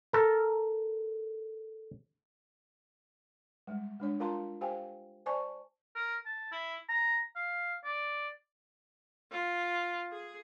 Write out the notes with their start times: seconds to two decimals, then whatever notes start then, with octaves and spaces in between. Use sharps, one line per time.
0.13 A4 A#4
3.67 G3 G#3
4.00 G#3 D4 C#5
4.20 F4 A#4 F5 A5 A#5 C6
4.61 G4 C5 F5 G5 G#5
5.26 C5 D5 G#5 A5 C#6
5.95 A#4
6.26 A5
6.52 E4
6.89 A#5
7.36 F5
7.84 D5
9.32 F4
10.12 G#4